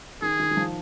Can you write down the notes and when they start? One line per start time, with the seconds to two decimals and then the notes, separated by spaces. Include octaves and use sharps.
0.22 D#3 G#4
0.40 D#3
0.51 D#3
0.57 F3